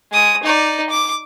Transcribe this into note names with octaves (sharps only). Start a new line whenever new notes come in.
G#3 D#6
D#4 D5
D6